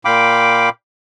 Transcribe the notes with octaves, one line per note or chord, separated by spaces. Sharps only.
A#2 F5 G5 B5 D6